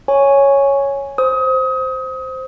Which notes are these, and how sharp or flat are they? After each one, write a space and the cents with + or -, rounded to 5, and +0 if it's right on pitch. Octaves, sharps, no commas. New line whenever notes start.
C#5 +0 G#5 +0
C5 +0 D#6 +30